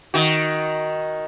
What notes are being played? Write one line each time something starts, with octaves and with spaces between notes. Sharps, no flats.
D#3 F#4